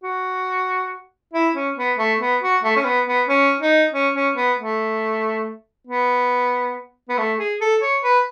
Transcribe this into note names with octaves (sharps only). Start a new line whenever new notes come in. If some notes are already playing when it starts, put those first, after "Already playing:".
F#4
E4
C#4
B3
A3
B3
F#4
A3
C#4
B3
B3
C#4
D#4
C#4
C#4
B3
A3
B3
B3
A3
G#4
A4
C#5
B4